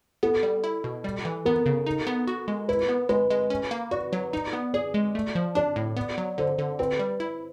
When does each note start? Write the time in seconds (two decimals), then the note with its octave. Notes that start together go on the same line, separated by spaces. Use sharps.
0.23 B3 A4
0.43 G3
0.64 E4
0.84 B2
1.04 G3
1.25 E3
1.45 B3 A#4
1.66 C#3
1.86 D#4
2.07 B3
2.27 F#4
2.48 G#3
2.68 E4 B4
2.89 B3
3.09 G#3 B4
3.31 G#3
3.50 C#4
3.71 A#3
3.91 F#4 D5
4.13 F#3
4.33 D#4
4.53 B3
4.74 G#4 D5
4.94 G#3
5.15 A3
5.35 F3
5.55 D4 D5
5.76 A2
5.96 B3
6.18 F#3
6.38 D3 C5
6.58 D3
6.79 C4 B4
6.99 G3
7.20 E4